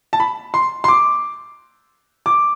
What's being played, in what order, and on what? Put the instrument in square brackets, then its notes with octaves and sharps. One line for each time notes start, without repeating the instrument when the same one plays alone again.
[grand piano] A5
B5
C6
C6
D6
D6